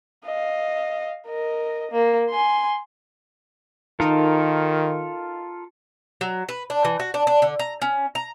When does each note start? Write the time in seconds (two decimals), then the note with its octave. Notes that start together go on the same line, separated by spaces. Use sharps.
0.25 D#5 F5
1.27 A#4 D#5
1.91 A#3
2.29 G#5 C6
4.00 D#3 D#4 F4 A4 A#4
6.21 F#3
6.49 B4
6.70 D4
6.85 E3
7.00 F#4
7.14 D4
7.27 D4
7.42 D3
7.59 A#5
7.82 C#4
8.15 A#5